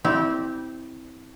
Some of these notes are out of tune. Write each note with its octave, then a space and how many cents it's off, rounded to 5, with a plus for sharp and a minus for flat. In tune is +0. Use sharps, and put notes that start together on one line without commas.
C4 +0 E4 -20 G4 -20